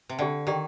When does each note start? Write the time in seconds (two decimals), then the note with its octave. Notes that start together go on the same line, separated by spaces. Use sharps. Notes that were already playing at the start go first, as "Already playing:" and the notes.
0.09 C3
0.19 D3 G4 D5 G5
0.47 D#3 G4 D5 G5